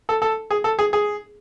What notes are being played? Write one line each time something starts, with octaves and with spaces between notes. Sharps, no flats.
A4
A4
G#4
A4
G#4
G#4